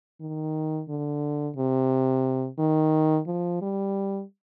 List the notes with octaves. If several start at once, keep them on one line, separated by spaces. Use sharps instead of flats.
D#3
D3
C3
D#3
F3
G3